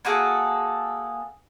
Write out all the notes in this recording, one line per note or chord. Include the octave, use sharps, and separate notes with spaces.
A#3 F#4 G#4 A4